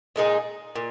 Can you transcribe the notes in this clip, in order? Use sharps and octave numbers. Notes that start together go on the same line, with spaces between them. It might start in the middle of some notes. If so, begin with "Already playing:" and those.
A#2 G#3 D#4 G#4
A#2